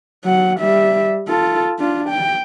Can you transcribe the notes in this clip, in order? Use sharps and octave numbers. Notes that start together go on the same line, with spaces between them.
F#3 F#5
G3 E5
F4 A4
D4 F4
G5